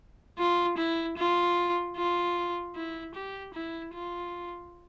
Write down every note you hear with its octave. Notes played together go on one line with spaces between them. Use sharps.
F4
E4
F4
F4
E4
G4
E4
F4